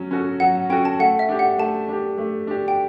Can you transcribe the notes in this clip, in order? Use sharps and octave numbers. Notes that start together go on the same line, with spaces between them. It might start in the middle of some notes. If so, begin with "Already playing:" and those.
Already playing: F#3 C#4
C#4 F#4 A4
F#3 F#5
F#5
C#4 F#4 A4 G5
A5
A3 F#5
E5
D4 G4
F#5
A3 A5
D4 G4
A3
D4 G4
G5